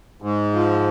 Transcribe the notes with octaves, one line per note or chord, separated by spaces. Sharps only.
G#2
F3